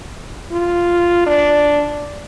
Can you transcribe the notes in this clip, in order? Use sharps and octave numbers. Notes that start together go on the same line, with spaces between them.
F4
D4